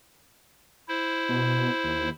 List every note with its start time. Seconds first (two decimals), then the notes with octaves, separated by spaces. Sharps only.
0.88 E4 C5
1.29 B2
1.84 D#2